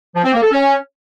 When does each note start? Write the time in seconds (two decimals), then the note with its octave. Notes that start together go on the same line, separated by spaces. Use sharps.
0.15 F3
0.24 C4
0.34 A#3
0.43 A4
0.52 C#4